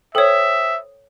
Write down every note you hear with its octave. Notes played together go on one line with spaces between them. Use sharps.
A4 C5 C#5 E5 G5 D#6